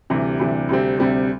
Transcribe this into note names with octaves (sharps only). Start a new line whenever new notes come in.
D2 C3 E3 G3
D2 C3 E3 G3
D2 C3 G3 C4
D2 C3 G3 C4